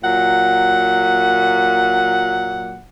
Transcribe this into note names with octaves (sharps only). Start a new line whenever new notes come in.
A#2 F#3 F#5